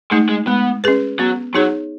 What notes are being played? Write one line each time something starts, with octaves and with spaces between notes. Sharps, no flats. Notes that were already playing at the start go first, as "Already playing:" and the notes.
G#3 A3 D#4
G#3
G#3 B3
C#4 G#4 B4
F#3 B3
F#3 D#4 G#4 C#5